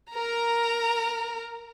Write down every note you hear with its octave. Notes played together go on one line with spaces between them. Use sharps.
A#4 A#5